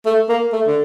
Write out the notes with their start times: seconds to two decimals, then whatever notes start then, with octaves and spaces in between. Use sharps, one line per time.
0.06 A3
0.29 A#3
0.53 A3
0.67 D3